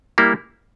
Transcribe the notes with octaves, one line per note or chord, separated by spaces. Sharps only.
G3 A#3 E4